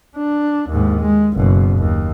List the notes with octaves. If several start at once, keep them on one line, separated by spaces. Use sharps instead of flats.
D4
D#2 G#2
G#3
F#1 B2
D#2